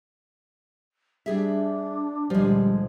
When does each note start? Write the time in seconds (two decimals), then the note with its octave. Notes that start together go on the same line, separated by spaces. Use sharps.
1.26 G3 D4 G#4 E5
2.30 C#2 A#2 D3 F3 G3 G#3